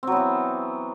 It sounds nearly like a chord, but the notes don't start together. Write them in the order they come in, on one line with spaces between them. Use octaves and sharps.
C4 F#3 B3 E3